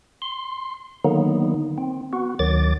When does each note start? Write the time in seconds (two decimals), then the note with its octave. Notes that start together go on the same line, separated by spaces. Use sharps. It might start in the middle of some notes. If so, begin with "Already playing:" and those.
0.22 C6
1.05 D3 D#3 F#3 A#3 B3 D#4
1.78 C4
2.13 B3 F#4
2.39 D2 D#3 F#3 D6 A6